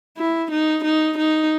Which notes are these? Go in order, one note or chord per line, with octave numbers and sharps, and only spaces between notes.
E4
D#4
D#4
D#4